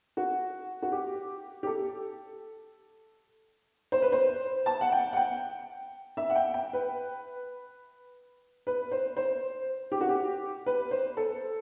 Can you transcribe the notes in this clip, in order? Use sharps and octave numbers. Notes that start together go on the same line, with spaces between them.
F#4
F#4
G4
G4
A4
C5
B4
C5
A5
F#5
G5
F#5
G5
E5
F#5
G5
G5
B4
B4
C5
C5
G4
F#4
G4
B4
C5
A4